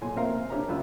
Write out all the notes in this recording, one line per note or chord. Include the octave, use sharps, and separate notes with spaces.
B1 A#2 C#5 G#5 C6
A#1 C3 C4 A#4 F5 A#5
D4 G4 C#5 E5 A#5
C#2 F#2 F4 B5 E6 F#6